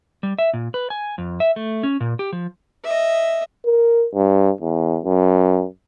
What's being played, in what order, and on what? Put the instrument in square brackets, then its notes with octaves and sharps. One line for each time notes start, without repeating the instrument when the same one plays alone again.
[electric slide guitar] G3
E5
A#2
B4
G#5
F2
E5
A3
C#4
A#2
G4
F3
[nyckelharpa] D#5 E5
[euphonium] A#4
G2
E2
F#2